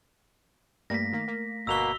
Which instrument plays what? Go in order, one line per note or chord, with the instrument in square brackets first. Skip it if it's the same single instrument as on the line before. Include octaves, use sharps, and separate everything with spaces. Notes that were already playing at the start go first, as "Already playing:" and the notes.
[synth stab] G2 G3 A#3 [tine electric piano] A3 [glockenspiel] A#6 B6
[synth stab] D#3 A#3
A#3
[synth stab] G1 F#4 B6 [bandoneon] B2 A#3 [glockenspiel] E6 F7 G7